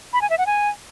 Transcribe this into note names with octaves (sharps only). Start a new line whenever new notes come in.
B5
G#5
E5
F#5
G#5